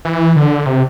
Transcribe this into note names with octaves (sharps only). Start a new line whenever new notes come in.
E3
D3
C3